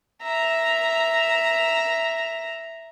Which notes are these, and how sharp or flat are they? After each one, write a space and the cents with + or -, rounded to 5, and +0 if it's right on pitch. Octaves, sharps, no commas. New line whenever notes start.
E5 +0 A#5 +0